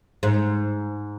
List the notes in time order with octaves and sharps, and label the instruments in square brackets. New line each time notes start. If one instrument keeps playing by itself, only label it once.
[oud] G#2